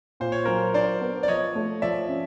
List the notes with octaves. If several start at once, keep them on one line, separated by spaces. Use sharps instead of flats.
A#2 C5
C#5
F#3 A#4 C5
D4 C5 D5
B3
D5
F3 C#5 D#5
A3
F3 D5 E5
C#4